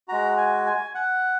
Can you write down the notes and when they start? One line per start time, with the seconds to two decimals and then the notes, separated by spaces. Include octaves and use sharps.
0.08 G#3 F#4 A#5
0.37 G#5
0.66 G#5
0.95 F#5